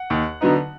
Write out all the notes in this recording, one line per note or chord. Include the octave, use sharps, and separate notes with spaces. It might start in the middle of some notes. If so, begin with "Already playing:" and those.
Already playing: F#5
D#2
D3 F#3 B3 D#4